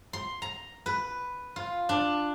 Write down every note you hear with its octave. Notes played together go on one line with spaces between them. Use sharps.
C6
A#5
B4
F4
D4